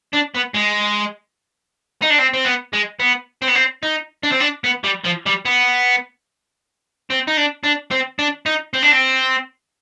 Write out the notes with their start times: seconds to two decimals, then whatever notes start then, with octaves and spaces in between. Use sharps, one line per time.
0.13 D4
0.35 B3
0.54 G#3
2.02 D#4
2.10 D4
2.18 C4
2.34 C4
2.45 B3
2.73 G#3
3.00 B3
3.42 C4
3.48 B3
3.55 C4
3.83 D#4
4.23 D4
4.32 C4
4.40 D4
4.64 B3
4.84 G3
5.04 F3
5.26 G3
5.45 B3
7.10 C4
7.28 D#4
7.37 D4
7.64 D4
7.91 C4
8.19 D4
8.46 D#4
8.74 C4
8.82 D4
8.92 C4